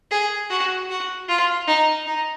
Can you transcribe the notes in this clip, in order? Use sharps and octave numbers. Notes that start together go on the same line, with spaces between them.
G#4
F#4
F#4
F4
D#4
D#4